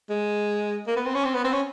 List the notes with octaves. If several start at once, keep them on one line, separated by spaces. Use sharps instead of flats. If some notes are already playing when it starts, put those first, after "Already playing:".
G#3
A#3
B3
C4
C#4
C4
B3
C4
C#4